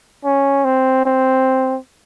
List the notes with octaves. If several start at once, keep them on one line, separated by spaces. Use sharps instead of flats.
C#4
C4
C4